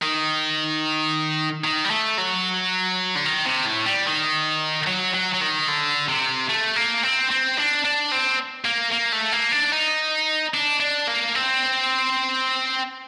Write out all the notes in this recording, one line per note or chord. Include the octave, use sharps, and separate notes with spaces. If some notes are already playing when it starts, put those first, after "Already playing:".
D#3
D#3
G3
A3
F#3
D3
D#3
C3
A2
G3
D#3
F#3
F#3
F#3
D#3
D3
C3
A3
A#3
C4
C4
D4
D4
C4
A#3
A#3
A3
A#3
D4
D#4
D4
D4
A#3
C4